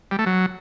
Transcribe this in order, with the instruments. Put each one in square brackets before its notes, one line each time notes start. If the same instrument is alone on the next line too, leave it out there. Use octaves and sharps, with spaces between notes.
[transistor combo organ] G3
A3
F#3